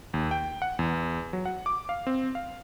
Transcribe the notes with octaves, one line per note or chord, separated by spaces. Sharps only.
D#2
G5
F#5
E2
F#3
F#5
D6
F5
C4
F5